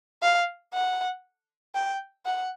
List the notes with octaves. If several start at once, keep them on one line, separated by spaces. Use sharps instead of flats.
F5
F#5
G5
F#5